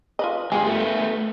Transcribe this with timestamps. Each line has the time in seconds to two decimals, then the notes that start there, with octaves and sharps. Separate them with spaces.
0.19 F4 B4 D#5
0.52 G2 G#3 F4 G4 G#4
0.64 A3 B3